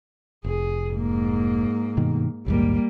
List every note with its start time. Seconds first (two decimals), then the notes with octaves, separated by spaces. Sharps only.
0.44 F1 G#4
0.92 G#2 A#3
1.97 G2 B2 D#3
2.46 A#1 D#2 G#2 G3 A#3